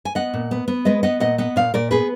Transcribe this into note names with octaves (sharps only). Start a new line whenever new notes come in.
G#5
B3 D#5 F#5
A#2
B3
B3
G#3 B4 D#5
B3 D#5 F#5
A#2 D#5 F#5
B3 D#5 F#5
A#2 D5 F5
A#2 A#4 D5
B3 G#4 B4